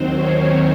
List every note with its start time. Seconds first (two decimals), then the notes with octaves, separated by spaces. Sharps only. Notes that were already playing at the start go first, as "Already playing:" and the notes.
Already playing: D#2 D#3 F#3 C4 C5
0.13 C#4 C#5